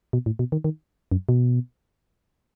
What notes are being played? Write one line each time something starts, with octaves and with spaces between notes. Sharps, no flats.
B2
A2
B2
D#3
D#3
F#2
B2